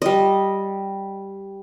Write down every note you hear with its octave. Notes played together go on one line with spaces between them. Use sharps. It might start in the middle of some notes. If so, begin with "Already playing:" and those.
G3 D#5